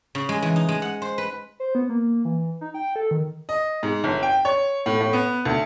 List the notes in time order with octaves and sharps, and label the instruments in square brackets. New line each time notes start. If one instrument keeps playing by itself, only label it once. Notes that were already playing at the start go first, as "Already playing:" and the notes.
[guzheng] C#3
G#3
E3
D#4
G#3
F#5
C5
B4
[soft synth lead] C5
B3
A#3
E3
D#4
G5
A4
D#3
[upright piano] D#5
G#2
G1
G5
C#5
A2
A2
B3
D2